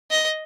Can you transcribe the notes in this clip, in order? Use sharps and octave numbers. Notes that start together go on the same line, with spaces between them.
D#5